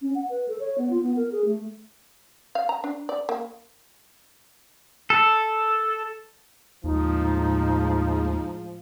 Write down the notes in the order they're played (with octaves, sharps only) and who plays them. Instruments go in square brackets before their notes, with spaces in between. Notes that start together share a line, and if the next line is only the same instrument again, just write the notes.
[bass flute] C#4
F#5
B4
A4
C#5
B3
F4
B3
A#4
G#4
A3
[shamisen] F5
A#5
D4
D5
A#3
[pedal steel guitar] A4
[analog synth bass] D#2 [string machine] A2 G#3 [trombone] F3 [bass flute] D#4